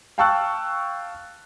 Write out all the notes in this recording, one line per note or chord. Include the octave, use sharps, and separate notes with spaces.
F5 G5 A5 C#6 E6 F#6